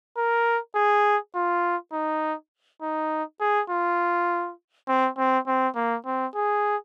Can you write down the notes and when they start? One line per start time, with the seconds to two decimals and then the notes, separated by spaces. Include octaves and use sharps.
0.17 A#4
0.75 G#4
1.35 F4
1.93 D#4
2.82 D#4
3.40 G#4
3.70 F4
4.88 C4
5.18 C4
5.47 C4
5.76 A#3
6.06 C4
6.35 G#4